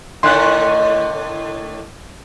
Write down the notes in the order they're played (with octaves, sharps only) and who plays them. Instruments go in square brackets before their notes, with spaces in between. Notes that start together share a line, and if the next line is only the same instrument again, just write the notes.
[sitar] A2 D3 D#3 [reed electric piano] C6 F#6